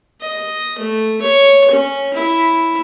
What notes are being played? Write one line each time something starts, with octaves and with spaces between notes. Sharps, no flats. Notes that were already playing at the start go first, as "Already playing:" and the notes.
D#5
A3
C#5
C#4
E4